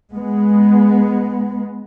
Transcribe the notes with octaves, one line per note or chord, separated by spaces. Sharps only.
G#3 B3